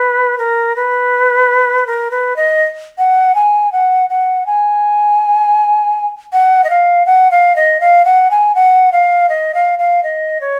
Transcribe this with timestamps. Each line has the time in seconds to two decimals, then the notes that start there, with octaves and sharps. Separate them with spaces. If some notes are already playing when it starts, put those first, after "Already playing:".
Already playing: B4
0.38 A#4
0.76 B4
1.87 A#4
2.11 B4
2.36 D#5
2.98 F#5
3.35 G#5
3.72 F#5
4.10 F#5
4.46 G#5
6.33 F#5
6.64 D#5
6.70 F5
7.06 F#5
7.31 F5
7.56 D#5
7.80 F5
8.05 F#5
8.31 G#5
8.55 F#5
8.92 F5
9.29 D#5
9.54 F5
9.79 F5
10.03 D#5
10.41 C#5